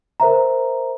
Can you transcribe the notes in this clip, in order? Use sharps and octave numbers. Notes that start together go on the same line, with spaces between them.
A#4 C5 E5 A#5